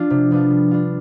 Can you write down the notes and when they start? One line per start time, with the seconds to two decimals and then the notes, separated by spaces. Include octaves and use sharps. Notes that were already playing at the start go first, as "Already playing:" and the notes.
Already playing: F3 D4 F4
0.10 C3
0.31 F3 B3 D4 F4
0.50 G3
0.71 D4 F4